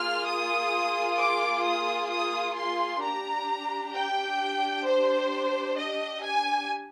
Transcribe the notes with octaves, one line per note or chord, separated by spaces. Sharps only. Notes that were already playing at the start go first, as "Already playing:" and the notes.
Already playing: A#3 F4 G#4 F6
D#6
D6
D#6
D#6
C6
D4 G4 A#5
G5
C5
D#5
G#5